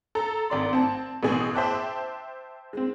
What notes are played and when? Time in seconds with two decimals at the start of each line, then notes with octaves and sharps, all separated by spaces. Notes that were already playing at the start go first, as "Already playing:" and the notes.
0.15 A4 A#5
0.50 G#1 D5 C6
0.73 C4 A5
1.23 A1 B2 G#4
1.54 C5 E5 G5 A5 D6 F#6
2.73 G#3 C4